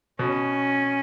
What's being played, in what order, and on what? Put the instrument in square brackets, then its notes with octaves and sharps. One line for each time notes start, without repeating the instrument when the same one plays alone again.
[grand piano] B2 [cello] C#4